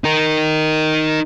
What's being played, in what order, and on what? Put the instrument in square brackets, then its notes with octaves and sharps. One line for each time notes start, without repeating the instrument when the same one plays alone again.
[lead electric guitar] D#4 A#4